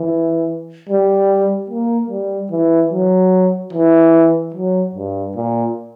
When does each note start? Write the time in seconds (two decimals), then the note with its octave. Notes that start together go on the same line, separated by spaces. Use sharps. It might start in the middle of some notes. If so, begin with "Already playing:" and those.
Already playing: E3
0.89 G3
1.70 A#3
2.10 G3
2.52 E3
2.93 F#3
3.73 E3
4.54 F#3
4.95 G2
5.36 A#2